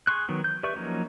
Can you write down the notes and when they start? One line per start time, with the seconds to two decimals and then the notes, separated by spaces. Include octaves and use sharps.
0.07 G#4 C6 C#6 F#6
0.28 D#3 F#3 B3
0.44 G6
0.63 G4 B4 D5 E5 C#6
0.76 F3 F#3 A#3 C#4 D#4